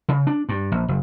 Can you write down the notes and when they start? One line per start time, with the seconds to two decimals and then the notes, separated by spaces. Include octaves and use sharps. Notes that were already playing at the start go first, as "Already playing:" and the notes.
0.09 C#3
0.27 D4
0.49 G2
0.72 A#1
0.88 F#1